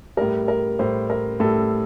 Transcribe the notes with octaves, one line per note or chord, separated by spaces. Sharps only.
A2 G3 A#4
A#4
A2 G3 C5
A#4
A2 G3 A4